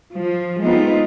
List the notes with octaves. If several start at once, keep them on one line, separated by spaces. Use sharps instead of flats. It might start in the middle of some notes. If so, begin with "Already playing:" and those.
F3
G#3 A3 B3 C4 D#4 F4